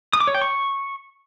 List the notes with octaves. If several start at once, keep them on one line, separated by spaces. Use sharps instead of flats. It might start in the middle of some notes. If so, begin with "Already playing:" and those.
D#6
D6
C#5
G5
C#6